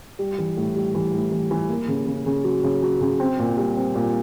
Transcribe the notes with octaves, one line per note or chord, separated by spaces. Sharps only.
G3
E3
A2
G3
E3
A2
E3
E3
A#3
C#3
C#3
C#3
F#3
C#3
F#3
C#3
C4
A#2
G3
C4
A#2